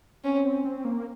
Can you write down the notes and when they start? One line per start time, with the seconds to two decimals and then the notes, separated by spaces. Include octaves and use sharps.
0.24 C4 C#4
0.44 C4
0.65 C4
0.85 A#3